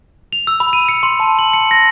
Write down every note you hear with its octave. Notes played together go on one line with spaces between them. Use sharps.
F7
E6
B5
D#7
C#7
C6
A5
F#7
C#7
A#6